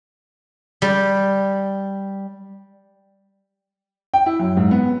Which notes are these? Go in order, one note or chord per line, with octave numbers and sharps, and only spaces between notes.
G3
G5
E4
F#2
G#2
B3